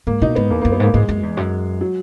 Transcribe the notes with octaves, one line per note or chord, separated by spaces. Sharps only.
G#2 A#3
B2 D#4
G#2 B3
E2 A#3
A#3
F#2
B3
G#2 A#3
G#2 G#3
F#2
E2
F#2
F#3